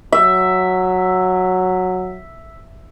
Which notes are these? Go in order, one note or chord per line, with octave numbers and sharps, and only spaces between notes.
F#3 E5